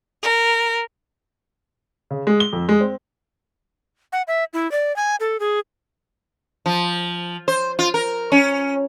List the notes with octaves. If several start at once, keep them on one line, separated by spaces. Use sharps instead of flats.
A#4
C#3
G#3
G7
F2
G#3
C4
F#5
E5
E4
D5
G#5
A4
G#4
F3
C5
F4
A#4
C#4